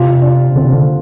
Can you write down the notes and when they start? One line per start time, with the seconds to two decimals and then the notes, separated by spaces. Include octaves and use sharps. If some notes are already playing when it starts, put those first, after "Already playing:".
Already playing: C3 F4
0.22 D4
0.56 D3 C4
0.65 C3
0.73 D3